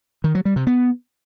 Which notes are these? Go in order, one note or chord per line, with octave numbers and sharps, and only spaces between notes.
D#3
F#3
G3
C3
B3